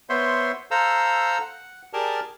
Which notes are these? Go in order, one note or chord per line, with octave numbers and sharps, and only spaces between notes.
B3 C5 C#5 E5 C6
A4 C5 F5 A#5 E6
F#5
G4 G#4 A#4 D5 A5 F6